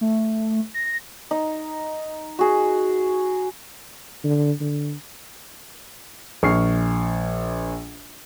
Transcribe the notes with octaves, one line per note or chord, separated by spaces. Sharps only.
A3
A#6
D#4
F#4 G#4
D3
D3
A#1 C#6 F6 C7